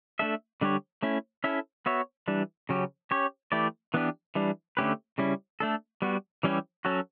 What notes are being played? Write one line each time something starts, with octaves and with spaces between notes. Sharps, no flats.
A3 D4 A4 E5
D3 G3 D4 G4 C#5
A3 C#4 E4
C#4 E4 A4 E5
B3 F#4 C#5 E5
E3 G3 D4
C#3 F#3 C#4 G4
C#4 G4 C#5
E3 A3 E4 G4 D5
E3 B3 D4 G4
E3 G3 D4
D3 A3 C#4 G4 B4
C#3 G3 C#4 E4
A3 D4 A4
G3 B3 F#4
E3 G3 C#4 E4 G4
F#3 C#4 F#4 A4